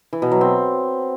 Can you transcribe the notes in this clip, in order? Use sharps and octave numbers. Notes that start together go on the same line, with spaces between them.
E3
B2
F#3
C4